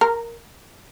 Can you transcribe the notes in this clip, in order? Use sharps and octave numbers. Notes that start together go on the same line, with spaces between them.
A#4